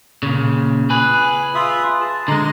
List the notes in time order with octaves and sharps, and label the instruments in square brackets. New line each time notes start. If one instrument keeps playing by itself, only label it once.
[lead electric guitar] A#2 C#3
[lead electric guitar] G#4 B4 [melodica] G#5
[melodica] F4 E5 D#6
A5
[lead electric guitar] D3 G#3 [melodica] D#5 A#5 C6